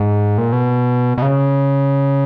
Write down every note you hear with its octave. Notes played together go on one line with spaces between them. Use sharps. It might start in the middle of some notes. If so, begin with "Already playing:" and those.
Already playing: G#2
A#2
B2
B2
C#3